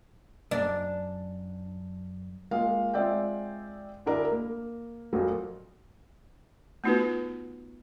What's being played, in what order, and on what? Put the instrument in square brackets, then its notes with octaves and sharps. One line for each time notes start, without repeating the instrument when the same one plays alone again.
[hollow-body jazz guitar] F#2 [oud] D4
[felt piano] G#3 A#3 F4 F5
G#3 C4 F4 D5 E5 G5
D2 D4 E4 A#4 D5
A#3
F2 A#2 F3 F#3 A#3
[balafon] A3 B3 D#4 F4 F#4 B4